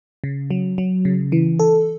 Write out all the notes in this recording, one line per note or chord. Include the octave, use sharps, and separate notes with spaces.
C#3
F#3
F#3
C#3
E3
A4